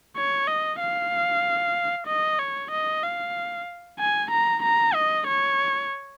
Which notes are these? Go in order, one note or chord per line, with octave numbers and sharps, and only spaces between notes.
C#5
D#5
F5
D#5
C#5
D#5
F5
G#5
A#5
A#5
D#5
C#5